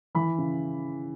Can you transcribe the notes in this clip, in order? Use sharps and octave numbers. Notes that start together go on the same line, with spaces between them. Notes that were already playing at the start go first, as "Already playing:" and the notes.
E3 B5
C#3